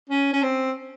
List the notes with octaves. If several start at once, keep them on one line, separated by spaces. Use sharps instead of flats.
C#4
C#4
C4